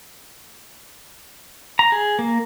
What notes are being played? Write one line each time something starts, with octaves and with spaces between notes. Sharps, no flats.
A#5
G#4
A#3